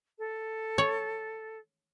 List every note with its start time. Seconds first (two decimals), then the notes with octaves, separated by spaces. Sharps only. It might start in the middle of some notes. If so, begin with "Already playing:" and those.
0.19 A4
0.78 C#5